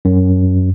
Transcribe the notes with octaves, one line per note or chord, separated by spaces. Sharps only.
F#2